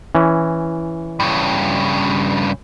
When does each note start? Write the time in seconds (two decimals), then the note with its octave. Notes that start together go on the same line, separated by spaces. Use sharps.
0.15 E3 C#4
1.20 G2 C#3